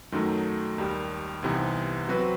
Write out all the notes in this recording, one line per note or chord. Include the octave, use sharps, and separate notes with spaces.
F#2 D#3 F#3 A3 D#4
D#2 D#3 G3
C2 C3 E3 B3 D#4
F#3 C4 F#4 B4